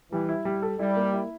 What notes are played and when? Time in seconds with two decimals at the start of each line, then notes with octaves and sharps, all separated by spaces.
0.12 E3 G3
0.29 E4
0.45 G3
0.62 A4
0.79 G3 E4
0.96 A#3
1.13 E4